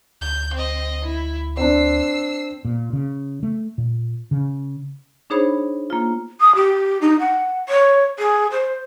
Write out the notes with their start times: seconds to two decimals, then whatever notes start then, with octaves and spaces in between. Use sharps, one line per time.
0.21 D2 G6
0.54 C4 D#5
1.04 E4
1.57 C4 D4 E6 C7
2.65 A#2
2.93 C#3
3.43 A3
3.78 A#2
4.31 C#3
5.30 D4 D#4 G#4 C5 C#5 B5
5.90 A#3 F4
6.41 D#6
6.55 G4
7.01 D#4
7.20 F#5
7.69 C#5
8.19 G#4
8.51 C5